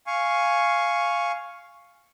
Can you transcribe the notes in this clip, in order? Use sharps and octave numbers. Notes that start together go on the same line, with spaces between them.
F5 G#5 C#6